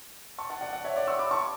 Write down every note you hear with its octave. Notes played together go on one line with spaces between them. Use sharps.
A5 C#6
F#5 A5
D5 F#5
D5 F#5
C#5 E5
D5 F#5
C#6 E6
B5 D6
A5 C#6